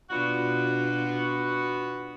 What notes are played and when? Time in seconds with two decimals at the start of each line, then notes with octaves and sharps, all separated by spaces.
0.10 B2 B3 D4 F4 F#4